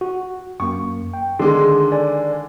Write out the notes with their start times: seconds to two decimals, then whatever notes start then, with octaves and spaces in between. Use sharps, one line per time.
0.01 F#4
0.60 F#2 A#3 C#6
1.14 G5
1.39 D3 D#3 G#3 C6 D6
1.92 A4 D5 G#5